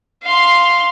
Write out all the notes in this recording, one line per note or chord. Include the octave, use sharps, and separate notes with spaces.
F5 C6